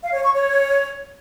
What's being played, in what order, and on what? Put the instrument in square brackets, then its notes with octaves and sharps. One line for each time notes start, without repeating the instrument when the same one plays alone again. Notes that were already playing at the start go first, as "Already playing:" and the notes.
[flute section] F5
C#5
C#6
C#5